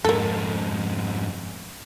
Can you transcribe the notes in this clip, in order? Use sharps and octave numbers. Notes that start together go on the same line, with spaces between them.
F2 G#2 A#3 A4